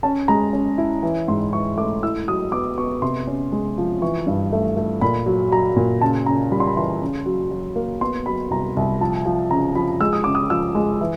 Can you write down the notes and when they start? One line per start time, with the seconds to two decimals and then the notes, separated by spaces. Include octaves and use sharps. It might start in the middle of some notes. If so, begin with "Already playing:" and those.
0.03 C#4 A5
0.28 G#3 A#5
0.53 C#4
0.78 E4
1.03 E3
1.28 G#2 C6
1.53 E3 C#6
1.77 A3 D6
2.03 E4 E6
2.28 F#3 D#6
2.52 B3 D6
2.78 B3 C#6
3.02 C3 C6
3.27 C#4
3.52 G#3
3.78 F3
4.02 E3 C#6
4.27 G2
4.52 A3
4.77 A3
5.01 A#2 B5
5.26 F#3
5.52 F#3 A#5
5.76 A#2
6.01 C#3 A5
6.26 C#3 A#5
6.51 G3 B5
6.60 C6
6.67 B5
6.76 E3 C6
7.02 C#3
7.26 F#3
7.51 F#3
7.76 A#3
8.01 B3 C6
8.26 F#3 B5
8.51 C2 A#5
8.77 C2
9.01 F3 A5
9.26 F3
9.51 C#3 A#5
9.75 F3 B5
10.01 G#3 E6
10.13 D#6
10.24 C#3 D6
10.35 D#6
10.50 F3 E6
10.75 G#3
11.01 E3